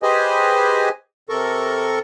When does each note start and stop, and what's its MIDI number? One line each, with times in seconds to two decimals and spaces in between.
0.03 0.89 67
0.03 0.89 68
0.03 0.89 71
0.03 0.89 72
0.03 0.89 75
0.03 0.89 80
1.29 1.99 48
1.29 1.99 69
1.29 1.99 70
1.29 1.99 85